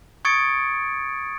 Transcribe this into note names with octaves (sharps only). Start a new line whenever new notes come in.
C#6 D#6 G#6 A6 C#7 D7